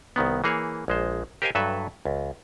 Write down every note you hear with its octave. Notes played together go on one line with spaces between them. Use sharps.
C2 D#3 B3
E3 A#3 G#4 C#5
A#1 G#3 C5
G4 A#4 C5 D#5 F5 G#5
G2 F#3 A4 B4 E5
C#2